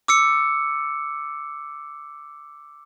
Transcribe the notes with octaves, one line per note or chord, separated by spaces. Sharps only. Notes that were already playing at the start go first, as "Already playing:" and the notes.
D6 E6 C#7